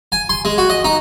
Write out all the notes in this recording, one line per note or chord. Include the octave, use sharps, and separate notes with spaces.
G#5
C6
G#3
F#4
D#5
D#4